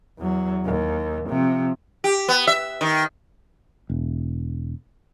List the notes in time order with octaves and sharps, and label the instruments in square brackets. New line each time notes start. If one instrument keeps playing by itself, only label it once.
[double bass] E2 F#3
D#2
C3 F3
[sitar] G4
B3
E5
D#3
[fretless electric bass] E1